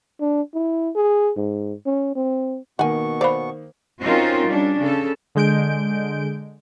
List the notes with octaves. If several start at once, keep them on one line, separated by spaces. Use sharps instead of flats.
D4
E4
G#4
G#2
C#4
C4
B2 D#3 A#3 B3 F#5 G#5 C#6
C5 D5 F5 B5
C4 C#4 D#4 F4 F#4 A#4
G3 C#4 D4
C#3 A4
D3 G#3 G6 D7